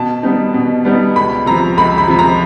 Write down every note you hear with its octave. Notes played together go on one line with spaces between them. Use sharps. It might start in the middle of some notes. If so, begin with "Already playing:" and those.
Already playing: B2 A5
G3 B3 D#4
B2
G3 B3 D#4
C#2 B5
C3 F3 A#5
C#2 B5
B5
C3 F3
A#5